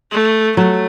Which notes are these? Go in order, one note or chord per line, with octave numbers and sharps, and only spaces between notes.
A3
F#3 A3